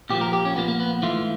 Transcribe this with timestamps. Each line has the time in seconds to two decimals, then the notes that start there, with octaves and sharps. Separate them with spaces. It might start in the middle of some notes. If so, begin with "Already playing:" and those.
0.10 A#2 F3 A#3 G4
0.21 A#4
0.33 G4
0.45 C#4
0.56 A#2 F3 A#3 B3
0.68 A#3
0.80 B3
1.02 G#2 E3 A3 F4